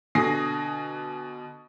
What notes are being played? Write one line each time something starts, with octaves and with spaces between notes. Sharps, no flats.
B2 D3 G#5 D#6 A#6 C7